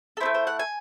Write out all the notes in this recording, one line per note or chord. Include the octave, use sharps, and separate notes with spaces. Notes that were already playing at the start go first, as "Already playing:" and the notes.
A4
A3 C4 E4 C5
C5
F#5
G#5